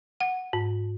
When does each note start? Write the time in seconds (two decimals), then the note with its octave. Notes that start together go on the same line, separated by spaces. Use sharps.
0.21 F#5
0.53 G#2